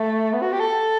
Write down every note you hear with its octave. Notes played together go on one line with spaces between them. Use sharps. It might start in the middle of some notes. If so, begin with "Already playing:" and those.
Already playing: A3
B3
F#4
G4
A4